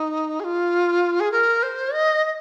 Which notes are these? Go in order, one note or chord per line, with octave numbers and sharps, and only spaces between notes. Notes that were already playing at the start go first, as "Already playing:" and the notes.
Already playing: D#4
G#4
F4
G#4
A#4
C5
D#5
D#5